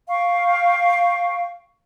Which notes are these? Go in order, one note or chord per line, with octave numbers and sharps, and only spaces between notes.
F5 G5 C#6